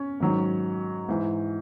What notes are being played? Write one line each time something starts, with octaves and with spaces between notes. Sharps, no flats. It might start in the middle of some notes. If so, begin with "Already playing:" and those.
Already playing: C#4
G#2 D#3 F#3
G#2 E3